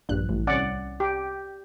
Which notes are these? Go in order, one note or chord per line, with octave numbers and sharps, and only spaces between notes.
A#1 G2 F#6
A1
C2 C#4 D5 F#5
G4